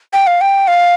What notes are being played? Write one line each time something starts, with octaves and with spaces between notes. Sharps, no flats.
G5
F5
G5
F5